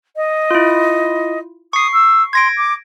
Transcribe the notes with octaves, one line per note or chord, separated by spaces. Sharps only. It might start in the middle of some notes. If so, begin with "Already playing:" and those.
D#5
E4 F4
C#6 D#6 C7
E6
C6 G#6 A#6 D7
D6